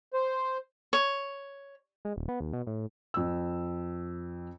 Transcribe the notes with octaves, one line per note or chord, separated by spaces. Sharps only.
C5
C#5
G#3
D#1
B3
D#2
B2
A2
F2 E6